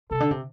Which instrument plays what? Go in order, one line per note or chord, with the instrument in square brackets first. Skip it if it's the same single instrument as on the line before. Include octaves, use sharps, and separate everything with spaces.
[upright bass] C3 [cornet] A4
[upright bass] D3
C3